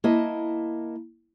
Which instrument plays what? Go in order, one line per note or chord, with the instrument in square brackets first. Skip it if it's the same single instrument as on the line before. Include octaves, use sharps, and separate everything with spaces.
[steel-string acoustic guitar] A#3 E4 D#5 A5